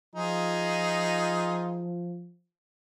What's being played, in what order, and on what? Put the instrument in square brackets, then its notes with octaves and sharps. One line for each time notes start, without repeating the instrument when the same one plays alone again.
[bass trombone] F3 [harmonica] D#4 F4 G#4